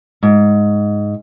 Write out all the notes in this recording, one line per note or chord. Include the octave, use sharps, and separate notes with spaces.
G#2